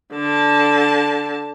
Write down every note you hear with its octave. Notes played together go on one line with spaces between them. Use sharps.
D3 A5